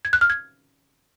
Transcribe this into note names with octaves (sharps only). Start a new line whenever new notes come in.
G#6
F#6
F6
G#6